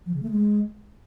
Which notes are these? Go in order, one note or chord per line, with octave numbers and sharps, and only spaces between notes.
F3
C#3
A3
G#3